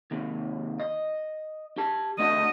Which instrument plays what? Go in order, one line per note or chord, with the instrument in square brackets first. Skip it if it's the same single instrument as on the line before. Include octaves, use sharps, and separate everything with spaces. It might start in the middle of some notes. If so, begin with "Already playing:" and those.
[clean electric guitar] D#2 C3
D#5
G4 A5
[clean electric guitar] A3 D4 F#4 [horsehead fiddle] D#5